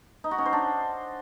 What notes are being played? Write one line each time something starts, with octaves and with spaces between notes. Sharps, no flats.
D#4
F#4
C#4
C5
D4